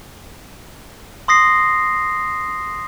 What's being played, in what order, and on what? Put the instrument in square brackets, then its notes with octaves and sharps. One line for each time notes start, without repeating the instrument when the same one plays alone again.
[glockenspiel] C6 D#6 A#6 C7